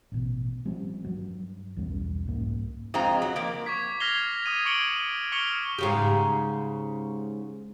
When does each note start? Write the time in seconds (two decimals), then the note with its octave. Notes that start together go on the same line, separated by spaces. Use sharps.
0.12 A1 B2
0.65 F3 G3 C4 C#4
1.04 G2 F#3
1.76 B1 E2 G3 C#4
2.26 C2 G#2 A#3
2.94 F2 G#3 C4 F4 A#5
3.22 F#3
3.36 F3 A#3
3.66 C#6 D6 G#6 B6
4.00 F6 G#6 A#6 C7 F7 G7
4.46 D6 D#6 G#6 D#7
4.65 C#6 G#6 C#7 D7 F#7 G7
4.96 D7
5.32 C#6 F6 B6 C#7 F7 G7
5.78 G#2 C#3 G4